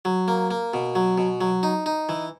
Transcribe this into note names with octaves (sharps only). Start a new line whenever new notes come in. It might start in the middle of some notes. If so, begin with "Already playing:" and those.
F#3
A#3
A#3
B2
F#3
B2
F#3
D#4
D#4
E3